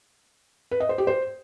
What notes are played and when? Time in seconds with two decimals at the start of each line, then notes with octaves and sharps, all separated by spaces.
0.71 B4
0.80 D#5
0.89 C5
0.98 G4
1.07 C5